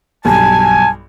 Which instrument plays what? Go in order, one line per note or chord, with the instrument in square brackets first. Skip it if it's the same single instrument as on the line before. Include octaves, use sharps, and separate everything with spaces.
[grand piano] B1 G2 [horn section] G#5 [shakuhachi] A5